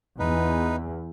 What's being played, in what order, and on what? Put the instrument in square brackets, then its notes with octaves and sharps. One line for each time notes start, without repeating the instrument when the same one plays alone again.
[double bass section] E2 [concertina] D#4 B4